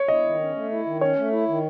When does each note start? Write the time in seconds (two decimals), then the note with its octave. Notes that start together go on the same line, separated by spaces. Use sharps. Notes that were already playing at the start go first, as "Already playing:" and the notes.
Already playing: C#5
0.08 E4 D#5
0.25 D#3
0.40 C#4
0.55 A3
0.71 E4
0.86 D#3
1.01 C#4 C#5
1.17 A3
1.32 E4
1.48 D#3